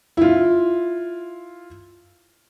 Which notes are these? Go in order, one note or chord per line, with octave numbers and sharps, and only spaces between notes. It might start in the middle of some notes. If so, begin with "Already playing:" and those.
E4 F4